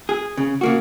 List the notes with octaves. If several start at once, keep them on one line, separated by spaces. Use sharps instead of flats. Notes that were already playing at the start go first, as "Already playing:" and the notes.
G#4
C#3
C#3 A#3 F#4